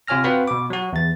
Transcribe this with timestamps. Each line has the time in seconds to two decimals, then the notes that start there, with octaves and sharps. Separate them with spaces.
0.07 C3 F4 C#5 G#5 F6 A#6
0.24 C4 F#4 B4 C5 F5 B5
0.48 B2 D6
0.70 F#3 F#4
0.93 E2 A6